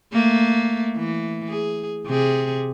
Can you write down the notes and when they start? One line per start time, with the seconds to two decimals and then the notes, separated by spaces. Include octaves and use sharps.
0.13 A3 A#3
0.97 E3
1.49 G#4
2.07 C3 G#4